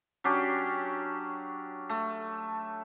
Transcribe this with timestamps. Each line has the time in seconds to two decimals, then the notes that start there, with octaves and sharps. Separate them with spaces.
0.24 F#3 C#4 D4 G4
1.90 A3